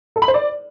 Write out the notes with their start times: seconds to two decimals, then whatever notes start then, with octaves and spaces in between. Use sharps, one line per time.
0.16 A4
0.22 B5
0.28 C5
0.34 D5